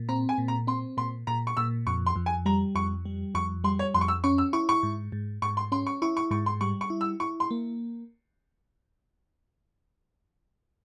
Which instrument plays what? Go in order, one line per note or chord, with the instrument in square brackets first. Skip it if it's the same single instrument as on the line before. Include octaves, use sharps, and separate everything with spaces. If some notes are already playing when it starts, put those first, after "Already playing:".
Already playing: [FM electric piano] A#2
[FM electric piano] C4 [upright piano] A#5
[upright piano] G#5
[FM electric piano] A#2
[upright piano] A#5
[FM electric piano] C4 [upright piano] C6
[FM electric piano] A#2 [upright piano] C6
[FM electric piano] A#2 [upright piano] A#5
[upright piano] C#6
[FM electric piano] A#2 [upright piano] E6
[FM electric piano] F2 [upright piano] C#6
[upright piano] C6
[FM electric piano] F2
[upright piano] G#5
[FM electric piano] G3 [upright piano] A#5
[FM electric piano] F2 [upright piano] C#6
[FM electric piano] G3
[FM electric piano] F2 [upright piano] C#6
[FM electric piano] G3 [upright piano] C6
[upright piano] C#5
[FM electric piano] F2 [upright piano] C6
[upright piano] C#6
E6
[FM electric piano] C#4 [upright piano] C#6
[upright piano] E6
[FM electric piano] E4 [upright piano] C#6
[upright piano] C#6
[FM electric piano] G#2
G#2
[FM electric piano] G#2 [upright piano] C#6
[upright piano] C6
[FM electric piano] C#4 [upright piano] C6
[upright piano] C#6
[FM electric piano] E4 [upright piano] C#6
[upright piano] C#6
[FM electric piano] G#2 [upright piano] C#6
[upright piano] C6
[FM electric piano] G3 [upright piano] C#6
[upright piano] C#6
[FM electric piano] E4
[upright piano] E6
[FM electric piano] E4 [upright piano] C#6
[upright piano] C6
[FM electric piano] A#3